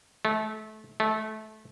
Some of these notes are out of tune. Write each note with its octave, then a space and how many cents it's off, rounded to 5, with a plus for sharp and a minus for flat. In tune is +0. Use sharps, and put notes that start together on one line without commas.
A3 -25
A3 -20